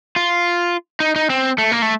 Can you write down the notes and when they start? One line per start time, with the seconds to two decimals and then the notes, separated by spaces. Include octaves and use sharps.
0.16 F4
1.00 D#4
1.16 D#4
1.30 C4
1.58 A3
1.72 A#3
1.82 A3